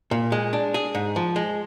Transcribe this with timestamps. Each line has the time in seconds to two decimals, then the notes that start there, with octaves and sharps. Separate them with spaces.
0.11 A#2
0.32 G#3
0.53 D4
0.74 G#4
0.95 G#2
1.16 F3
1.36 G#3